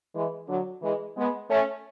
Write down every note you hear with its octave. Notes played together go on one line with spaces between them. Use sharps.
E3 G#3
D3 F#3
E3 G#3
G#3 B3
A3 C#4